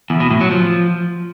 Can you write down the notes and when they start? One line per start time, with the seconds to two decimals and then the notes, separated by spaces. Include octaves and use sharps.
0.10 E2
0.20 B2
0.30 A2
0.41 F#3
0.51 F3